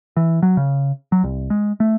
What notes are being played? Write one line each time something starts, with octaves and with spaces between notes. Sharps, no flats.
E3
F#3
C#3
F#3
C2
G#3
A3